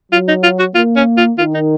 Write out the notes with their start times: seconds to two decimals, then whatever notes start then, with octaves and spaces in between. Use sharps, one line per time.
0.12 F#3 F4
0.28 D#4
0.43 F4
0.59 F#4
0.75 A#3 F4
0.96 C#4
1.17 F4
1.38 D#3 F4
1.54 D#4